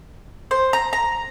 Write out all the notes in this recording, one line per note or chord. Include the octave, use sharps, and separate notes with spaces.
C5
A#5
A#5